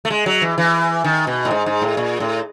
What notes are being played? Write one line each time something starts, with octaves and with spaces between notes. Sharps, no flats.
A3
G#3
F#3
E3
E3
D#3
B2
A2
G#2
G#2
A2
A#2
A2